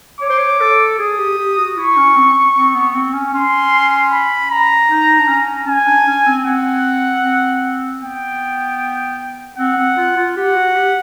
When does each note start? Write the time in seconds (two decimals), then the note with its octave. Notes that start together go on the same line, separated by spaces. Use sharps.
0.21 C#5 D6
0.30 C5
0.38 C#5
0.60 A4
0.99 G#4 D#6
1.19 G4
1.38 G4
1.58 F#4
1.77 E4 C#6
1.97 C#4
2.16 C4
2.56 C4
2.75 B3
2.95 C4
3.14 C#4
3.33 C#4 C6
4.12 B5
4.51 A#5
4.90 D#4
5.19 D4
5.29 C#4
5.67 C#4 G#5
5.87 D4
6.07 C#4
6.27 C4
6.45 C4 F#5
7.24 C4
8.02 B3 G5
9.58 C4 F#5
9.78 C4
9.97 F4
10.17 F4
10.36 G4 F#5
10.55 F#4
10.76 G4